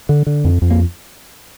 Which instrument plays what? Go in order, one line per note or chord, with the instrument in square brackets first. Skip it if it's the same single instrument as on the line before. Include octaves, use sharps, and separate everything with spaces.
[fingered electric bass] D3
D3
F2
F2
A#3